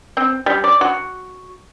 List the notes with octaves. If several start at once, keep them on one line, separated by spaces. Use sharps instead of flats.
C4
G3
D5
F#4